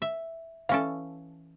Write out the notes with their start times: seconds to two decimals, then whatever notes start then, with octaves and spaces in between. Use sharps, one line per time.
0.02 E5
0.69 E3 C#4 A4 F5